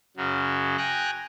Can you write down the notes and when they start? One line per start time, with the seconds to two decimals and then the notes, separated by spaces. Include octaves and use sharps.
0.17 F#2 C#3 F#3
0.78 G5 G#5 A#5 F#6